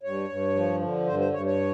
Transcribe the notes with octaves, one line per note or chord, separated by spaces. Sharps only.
G2 C#5
G2
F3
D3
G2 C5
C5
G2 C#5
C#5